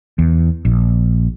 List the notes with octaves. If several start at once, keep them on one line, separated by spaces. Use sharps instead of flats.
E2
A#1